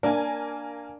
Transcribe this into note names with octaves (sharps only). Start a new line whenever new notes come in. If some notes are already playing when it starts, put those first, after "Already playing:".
A#3 D4 A#4 G#5